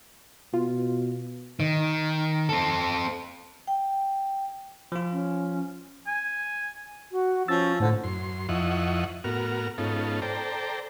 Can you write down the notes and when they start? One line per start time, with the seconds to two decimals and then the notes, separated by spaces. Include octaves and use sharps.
0.54 B2 F4
1.60 D#3
2.49 C4 A4
3.67 G5
4.92 F3 F4
5.13 C#4
6.07 G#5
7.12 F#4
7.48 F3 C#4 E6 A6
7.80 A2 D3 C5
8.04 F#2 C6
8.49 F2 F3 E4 D#5 F#5 C#6
9.24 A2 B3 F#4 A#4 F6
9.78 G#2 B3 C#4 D#4 F4 A4
10.22 A4 C5 D5 G5 A#5